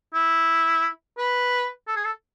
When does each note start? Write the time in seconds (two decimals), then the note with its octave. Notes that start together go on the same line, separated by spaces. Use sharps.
0.14 E4
1.18 B4
1.88 A4
1.96 G#4
2.05 A4